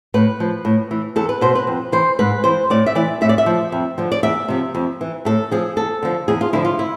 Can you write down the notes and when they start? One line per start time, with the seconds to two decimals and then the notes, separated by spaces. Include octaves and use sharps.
0.14 A2 B4
0.40 F3
0.65 A2
0.91 E3
1.16 E2 A4
1.29 B4
1.41 B2 C5
1.55 B4
1.67 F2
1.92 E3 C5
2.19 G#2 B4
2.44 E3 C5
2.70 A2 D5
2.86 E5
2.95 E3 D5
3.21 A2 E5
3.29 D5
3.38 E5
3.46 F3
3.72 F2
3.98 D3 F3
4.12 D5
4.23 E2 E5
4.48 C3 F3
4.75 F2
5.01 E3
5.25 A2 A4
5.51 F3 G#4
5.76 E2 A4
6.03 D3 F3
6.28 E2 G#4
6.41 F4
6.53 D3 F3 E4
6.65 F4
6.79 E4